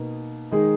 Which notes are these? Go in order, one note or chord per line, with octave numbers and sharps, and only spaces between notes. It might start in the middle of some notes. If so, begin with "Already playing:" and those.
Already playing: B2 A#3 D#4
D#3 G#3 D#4 G#4